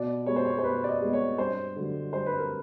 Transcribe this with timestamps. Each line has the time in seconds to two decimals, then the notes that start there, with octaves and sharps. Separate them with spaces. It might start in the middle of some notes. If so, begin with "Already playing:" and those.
Already playing: B2 D5
0.26 G#3 B3 C#5
0.36 C5
0.45 C#5
0.58 C5
0.64 B2 B4
0.84 D5
0.89 D#5
1.02 G#3 B3
1.13 C#5
1.38 G2 C5
1.76 D3 F#3
2.13 G2 C5
2.26 B4
2.38 A#4